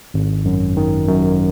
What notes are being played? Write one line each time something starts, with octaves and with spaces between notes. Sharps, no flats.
G#1
F#2
D#3
F#2